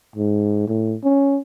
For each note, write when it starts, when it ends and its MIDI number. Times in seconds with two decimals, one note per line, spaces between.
0.16 0.64 44
0.68 0.96 45
1.04 1.39 61